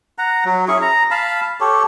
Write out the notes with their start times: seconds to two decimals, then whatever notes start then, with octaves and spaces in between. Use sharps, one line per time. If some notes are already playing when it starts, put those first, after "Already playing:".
0.18 F#5 A#5
0.45 F#3
0.68 C#4 E4 G#4 C#6
0.82 A#5
1.11 F5 A5 B5
1.60 G4 A4 C#5